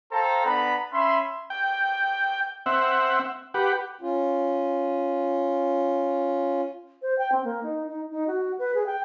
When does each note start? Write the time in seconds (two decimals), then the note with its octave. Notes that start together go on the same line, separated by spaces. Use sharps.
0.12 A4 C5 F5 G5 A5 A#5
0.45 B3 D4 A#5 B5
0.93 C#4 E5 B5 C6
1.50 G5
2.66 C4 E5 F#5
3.54 G4 B4 F#5
4.01 C#4 F4
7.02 C5
7.18 G5
7.32 C4
7.44 A#3
7.63 D#4
7.88 D#4
8.11 D#4
8.27 F#4
8.59 B4
8.75 G#4
8.86 G5